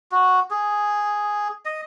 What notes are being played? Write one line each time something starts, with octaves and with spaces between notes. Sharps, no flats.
F#4
G#4
D#5